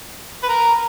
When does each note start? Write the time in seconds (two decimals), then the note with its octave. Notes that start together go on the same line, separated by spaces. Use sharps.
0.43 B4
0.48 A#4